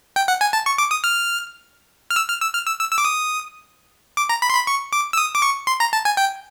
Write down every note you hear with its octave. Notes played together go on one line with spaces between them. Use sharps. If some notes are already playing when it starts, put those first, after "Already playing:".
G5
F#5
G#5
A5
C#6
D6
D#6
F6
F6
E6
F6
E6
F6
E6
E6
E6
D6
D#6
D6
A#5
B5
C6
B5
C#6
D6
E6
D#6
D6
C#6
C6
A#5
A5
G#5
G5